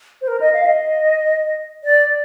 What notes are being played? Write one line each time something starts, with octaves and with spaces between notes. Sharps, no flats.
C5
A#4
D#5
F5
D#5
D5